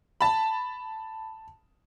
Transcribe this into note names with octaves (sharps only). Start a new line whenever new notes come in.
A5 B5